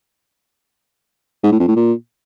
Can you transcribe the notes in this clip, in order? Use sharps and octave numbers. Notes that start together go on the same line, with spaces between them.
G#2
A2
F2
A2
A#2